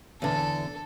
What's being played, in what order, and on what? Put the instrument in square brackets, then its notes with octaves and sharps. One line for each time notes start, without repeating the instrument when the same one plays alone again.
[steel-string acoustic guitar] E2 D3 [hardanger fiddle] A4